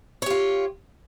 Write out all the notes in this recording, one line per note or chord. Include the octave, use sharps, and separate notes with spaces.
F4 G4 C#5